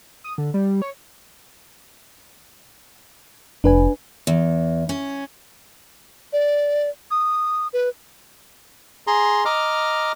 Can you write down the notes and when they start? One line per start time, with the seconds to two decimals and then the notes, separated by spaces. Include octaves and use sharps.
0.24 D#6
0.38 D3
0.54 G3
0.82 C#5
3.64 F1 D4 B4 G#5
4.27 E2
4.89 C#4
6.33 D5
7.11 D#6
7.73 B4
9.07 G#4 A#5 C6
9.45 D#5 A#5 D6 F6